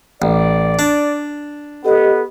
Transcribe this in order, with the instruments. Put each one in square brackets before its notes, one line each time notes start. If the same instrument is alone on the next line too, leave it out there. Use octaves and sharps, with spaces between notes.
[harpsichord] A1 [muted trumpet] D5
[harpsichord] D4
[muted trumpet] B3 [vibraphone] G4 D#5 [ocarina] A4